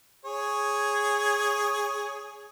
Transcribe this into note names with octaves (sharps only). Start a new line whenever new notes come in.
G#4 C#5